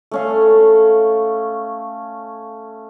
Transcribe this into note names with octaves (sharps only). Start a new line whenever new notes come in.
A3 C#4 F5